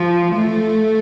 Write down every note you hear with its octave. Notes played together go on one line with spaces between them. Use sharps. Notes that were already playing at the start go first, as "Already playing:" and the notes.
Already playing: F3
A3